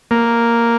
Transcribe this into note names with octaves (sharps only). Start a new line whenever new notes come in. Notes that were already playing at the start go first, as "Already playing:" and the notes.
A#3